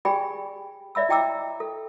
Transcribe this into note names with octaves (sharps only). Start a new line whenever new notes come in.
G4 G#4 D5 G5 G#5 B5
C#5 D5 E5 B5 E6
E4 D#5 G5 A#5 D6 E6
A4